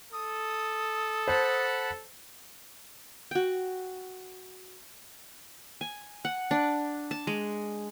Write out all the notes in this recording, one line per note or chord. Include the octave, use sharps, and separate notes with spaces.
A4 D#6
C5 F#5 A5 B5
F#4 G5
G#5
F#5
D4
A5
G#3